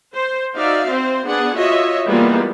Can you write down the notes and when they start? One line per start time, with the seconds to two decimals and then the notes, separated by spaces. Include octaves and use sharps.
0.14 C5
0.55 D#4 F#4 D5 E5 F5
0.90 C4 C5
1.27 B3 D4 G#4 F#5
1.56 F4 F#4 C#5 D#5 E5
2.08 E3 G3 G#3 A#3 B3 F4